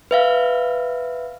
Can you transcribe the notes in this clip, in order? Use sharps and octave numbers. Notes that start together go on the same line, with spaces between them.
B4 E5 F5